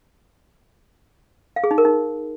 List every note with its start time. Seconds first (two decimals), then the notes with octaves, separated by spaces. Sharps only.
1.56 F5
1.64 G#4
1.71 D#4
1.78 A#4
1.85 D#4